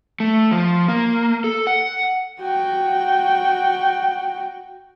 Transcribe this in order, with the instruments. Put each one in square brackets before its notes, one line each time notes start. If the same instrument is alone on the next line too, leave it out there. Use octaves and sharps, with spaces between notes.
[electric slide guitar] A3
F3
A#3
A4
F#5
[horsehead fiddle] F#4 G5